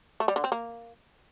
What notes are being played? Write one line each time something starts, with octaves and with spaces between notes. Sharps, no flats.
A3
G3
D3
C4
A#3